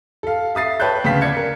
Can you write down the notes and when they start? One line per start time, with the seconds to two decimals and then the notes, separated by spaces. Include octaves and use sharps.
0.23 A4 F5
0.55 E5 D#6 A6 C7
0.80 B4 C#5 G5 A5 F#6 G6
1.04 D2 C#3 B4 F5 G5 B6
1.21 D5 G#6 C#7
1.37 A#4